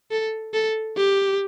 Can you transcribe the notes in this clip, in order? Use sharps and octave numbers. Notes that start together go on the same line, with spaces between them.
A4
A4
G4